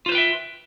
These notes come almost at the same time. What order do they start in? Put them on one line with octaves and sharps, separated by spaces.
F4 C5 B4 G5 E5